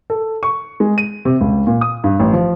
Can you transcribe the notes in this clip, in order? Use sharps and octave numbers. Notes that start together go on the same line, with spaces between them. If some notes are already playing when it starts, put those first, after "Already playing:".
A4
C#6
G#3
D#7
C3
C#2
A#2
D#6
G2
A1
F3